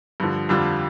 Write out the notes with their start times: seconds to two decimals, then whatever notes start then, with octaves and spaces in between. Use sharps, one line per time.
0.20 G2 D3 F3
0.49 F2 D3 G3 D4 F4